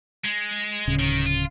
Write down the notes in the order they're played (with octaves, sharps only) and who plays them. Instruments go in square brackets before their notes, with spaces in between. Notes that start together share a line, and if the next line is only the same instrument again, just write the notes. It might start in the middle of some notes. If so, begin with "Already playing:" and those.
[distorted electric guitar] G#3
[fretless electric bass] D1 C#3
[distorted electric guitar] D#3
F4